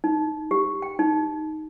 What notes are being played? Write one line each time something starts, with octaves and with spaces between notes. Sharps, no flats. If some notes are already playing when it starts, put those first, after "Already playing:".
D#4
G4
G5
D#4